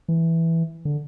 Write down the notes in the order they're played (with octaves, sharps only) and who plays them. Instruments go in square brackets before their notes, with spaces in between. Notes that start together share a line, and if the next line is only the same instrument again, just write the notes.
[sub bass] E3
D3